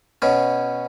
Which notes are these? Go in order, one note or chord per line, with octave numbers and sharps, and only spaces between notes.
B2 C#4